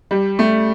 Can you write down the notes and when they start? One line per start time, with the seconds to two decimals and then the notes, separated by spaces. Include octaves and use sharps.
0.11 G3
0.39 A3